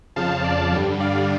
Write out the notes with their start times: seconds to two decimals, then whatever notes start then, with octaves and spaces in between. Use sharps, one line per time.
0.16 F2 C#3 F3 F5 A5
0.44 D5 F5
0.73 G2 D3 G3
1.00 D5 F5